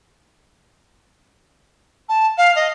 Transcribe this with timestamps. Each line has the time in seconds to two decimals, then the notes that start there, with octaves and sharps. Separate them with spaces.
2.09 A5
2.38 F5
2.56 D#5